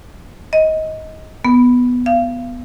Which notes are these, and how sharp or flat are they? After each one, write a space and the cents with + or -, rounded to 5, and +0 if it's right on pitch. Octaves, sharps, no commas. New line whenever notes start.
D#5 +20
B3 +0
F5 -30